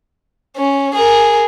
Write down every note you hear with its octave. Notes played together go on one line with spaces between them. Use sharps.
C#4
G#4 A#4